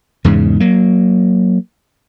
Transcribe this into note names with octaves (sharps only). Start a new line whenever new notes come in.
E2 G#2 C#3
F#3 A#3